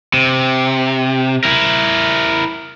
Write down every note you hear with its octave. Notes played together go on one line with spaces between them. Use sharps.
C3
E4 A#4